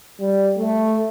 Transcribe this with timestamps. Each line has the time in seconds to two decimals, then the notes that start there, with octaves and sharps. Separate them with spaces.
0.20 G3
0.58 A3